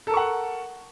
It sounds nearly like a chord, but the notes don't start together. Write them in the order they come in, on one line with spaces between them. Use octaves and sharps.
A4 A#4 C#6 F#5